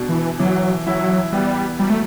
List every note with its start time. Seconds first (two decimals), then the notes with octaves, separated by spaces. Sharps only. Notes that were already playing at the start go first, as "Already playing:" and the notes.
Already playing: B2 D4
0.09 E3
0.39 E3 F#3
0.87 F#3 E4
1.33 G3 B3
1.79 F#3 G3
1.90 A3